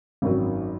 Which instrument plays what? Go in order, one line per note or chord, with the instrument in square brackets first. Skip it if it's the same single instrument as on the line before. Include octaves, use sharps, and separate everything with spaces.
[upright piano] G#1 F#2 D#3 F#3